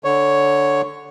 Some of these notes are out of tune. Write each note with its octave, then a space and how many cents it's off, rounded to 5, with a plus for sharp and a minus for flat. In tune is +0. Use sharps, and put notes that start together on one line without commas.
D3 +0 C#5 +0